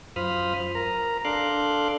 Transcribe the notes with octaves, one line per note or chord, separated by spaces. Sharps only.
F#2 F4 C5 B5 D#6 F6
A#4 A#5
D4 A4 F5 C6 D6 F#6